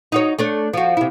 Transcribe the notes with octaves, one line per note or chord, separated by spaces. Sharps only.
D#4 F#4 C#5
A3 D4 C#5
F3 F#4
C3 E4